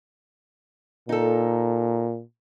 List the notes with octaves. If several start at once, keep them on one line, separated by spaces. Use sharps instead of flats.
A#2 D#4 A4